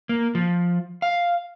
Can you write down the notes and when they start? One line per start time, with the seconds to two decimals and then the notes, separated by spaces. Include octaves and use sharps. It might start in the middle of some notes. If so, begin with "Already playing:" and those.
0.09 A#3
0.35 F3
1.02 F5